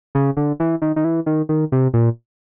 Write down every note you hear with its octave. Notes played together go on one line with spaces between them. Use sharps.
C#3
D3
E3
D#3
D#3
E3
D#3
D#3
C3
A#2